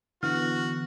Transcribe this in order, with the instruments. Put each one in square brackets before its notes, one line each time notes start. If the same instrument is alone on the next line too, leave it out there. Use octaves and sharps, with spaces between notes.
[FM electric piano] D3 E3 B3 [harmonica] F#4 [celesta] F6